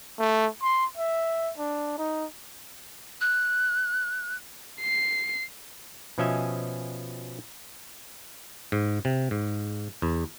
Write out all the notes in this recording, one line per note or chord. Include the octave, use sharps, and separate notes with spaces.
A3
C6
E5
D4
D#4
F#6
C7
B2 F3 C#4 D#5 E5 G#5
G#2
C3
G#2
E2